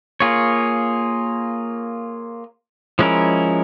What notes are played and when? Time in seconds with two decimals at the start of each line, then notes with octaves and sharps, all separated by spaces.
0.20 A#3 F4 G#4 C#5
2.99 F3 G#3 C#4 E4 A#4